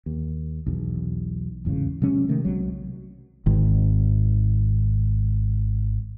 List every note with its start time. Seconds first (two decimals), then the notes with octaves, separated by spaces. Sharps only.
0.06 D#2
0.66 B1 E2
1.65 D1 E2 G#2 C#3
2.02 C3 F#3 G#3 C#4
2.29 C3 D#3 A3
2.44 B1 C3 F#3 G#3
3.46 G#1 G#2 D#3